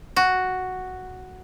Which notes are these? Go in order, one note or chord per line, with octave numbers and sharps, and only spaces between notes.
F#4